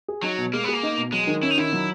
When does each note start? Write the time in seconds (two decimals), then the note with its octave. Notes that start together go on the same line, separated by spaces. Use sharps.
0.08 G#4
0.23 F#3 D#4
0.38 B2
0.53 G#3 A#3
0.64 B3
0.69 A#3 G#4
0.83 D#4
0.97 B2
1.12 F#3 G#3
1.27 D#3
1.42 C#4 E4
1.51 D#4
1.58 D#3 E4
1.73 F#3